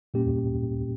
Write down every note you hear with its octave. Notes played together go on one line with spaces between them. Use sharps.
A#2 G3 A#3 C#4 G4